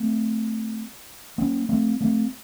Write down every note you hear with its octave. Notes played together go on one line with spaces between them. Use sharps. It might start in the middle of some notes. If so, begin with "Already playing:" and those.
Already playing: A3 C4
A#3 C#4
A3 C4
A3 C4